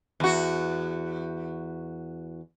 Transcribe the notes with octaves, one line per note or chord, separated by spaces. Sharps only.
E2 F#4